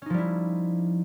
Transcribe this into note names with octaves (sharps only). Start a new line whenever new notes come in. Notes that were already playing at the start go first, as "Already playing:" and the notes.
F3 G3 C#4 D#4 E4